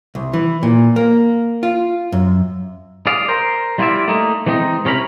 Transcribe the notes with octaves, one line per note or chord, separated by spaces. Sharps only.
C2
E3
A#2
A#3
F4
F#2
G#4 D5 F5
A#4 C5
G3 E4 F4 B4 D5 E5
A3 A#3 D#4
E3 G#3 C4 D4 D#4
C3 C#4 A#4 B5